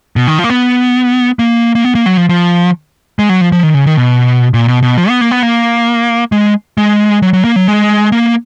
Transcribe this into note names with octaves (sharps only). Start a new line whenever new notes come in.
B2
D#3
F3
A#3
B3
A#3
A#3
B3
A#3
F#3
F3
F3
G#3
F#3
F3
F3
D#3
C#3
D#3
B2
A#2
B2
B2
F3
B3
A#3
B3
A#3
G#3
G#3
F#3
F#3
A#3
F#3
G#3
A#3